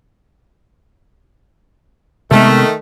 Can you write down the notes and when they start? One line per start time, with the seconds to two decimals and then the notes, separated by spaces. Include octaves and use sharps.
2.31 C3 D#3 G#3 A3 B3